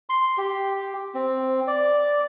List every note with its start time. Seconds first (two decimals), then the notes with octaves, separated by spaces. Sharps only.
0.10 C6
0.37 G4
1.14 C4
1.67 D5